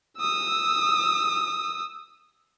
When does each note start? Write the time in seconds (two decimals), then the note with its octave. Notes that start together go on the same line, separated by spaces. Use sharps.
0.19 D#6 E6